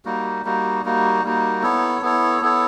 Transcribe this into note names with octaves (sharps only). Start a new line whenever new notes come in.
G3 A#3 D#4 F#4
G3 A#3 D#4 F#4
G3 A#3 D#4 F#4
G3 A#3 D#4 F#4
B3 E4 A4 C#5
B3 E4 A4 C#5
B3 E4 A4 C#5